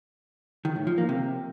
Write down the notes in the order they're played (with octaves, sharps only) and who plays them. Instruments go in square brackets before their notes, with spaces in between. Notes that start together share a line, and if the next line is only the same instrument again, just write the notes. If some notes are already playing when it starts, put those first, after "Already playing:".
[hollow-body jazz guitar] D#3
A2
F3
A#3
C3